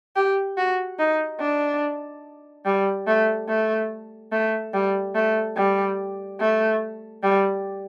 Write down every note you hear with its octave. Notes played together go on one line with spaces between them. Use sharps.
G4
F#4
D#4
D4
G3
A3
A3
A3
G3
A3
G3
A3
G3